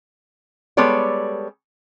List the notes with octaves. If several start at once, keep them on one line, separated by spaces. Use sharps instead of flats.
G3 G#3 B3 A4 C#5 D5